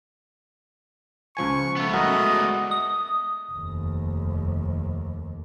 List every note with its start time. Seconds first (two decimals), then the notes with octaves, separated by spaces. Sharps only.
1.37 C#2 F3 G#5 C#6
1.77 A3 B3
1.94 G#3 F#4 A#4 D#5 D#6
2.35 D5 D6
2.71 D#6
3.52 F1 D#2